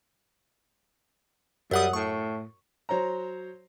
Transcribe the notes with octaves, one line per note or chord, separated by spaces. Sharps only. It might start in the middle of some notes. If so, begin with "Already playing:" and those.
F#2 G3 F#5 D#6
A2 C#6
F#3 C5 C#5 A#5